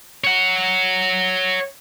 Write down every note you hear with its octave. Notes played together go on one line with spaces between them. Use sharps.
C#5 F#5